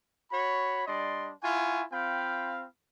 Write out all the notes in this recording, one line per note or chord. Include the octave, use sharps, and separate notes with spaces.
F#4 C#5 B5
G3 D4 D5 D#5 C6
E4 F4 F#5 G#5 C#6
C4 F4 F5 G5 B5